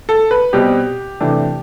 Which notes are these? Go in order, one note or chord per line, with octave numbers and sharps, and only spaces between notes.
A4
B4
B2 G3 C4 G4
C3 E3 A3 D4